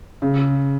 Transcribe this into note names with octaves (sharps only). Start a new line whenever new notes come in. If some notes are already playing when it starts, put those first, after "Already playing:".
C#3